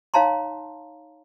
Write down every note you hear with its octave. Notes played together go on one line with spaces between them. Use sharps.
D#4 C#5 F5 A5 A#5 C6